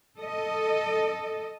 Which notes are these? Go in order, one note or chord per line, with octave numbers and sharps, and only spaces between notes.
A4 D#5